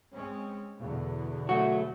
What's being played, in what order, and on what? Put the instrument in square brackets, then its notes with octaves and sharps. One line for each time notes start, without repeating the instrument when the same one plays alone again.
[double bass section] G#3 C4 C#4
E2 B2 D3
[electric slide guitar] F#3 A3 [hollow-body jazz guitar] F#4